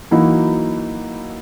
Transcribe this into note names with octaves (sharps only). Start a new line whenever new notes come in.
E3 F#3 A#3 D#4 E4 F#4